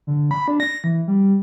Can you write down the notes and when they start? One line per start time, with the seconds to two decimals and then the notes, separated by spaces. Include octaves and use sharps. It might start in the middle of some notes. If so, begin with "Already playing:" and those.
0.07 D3
0.31 B5
0.48 D4
0.60 A#6
0.84 E3
1.08 G3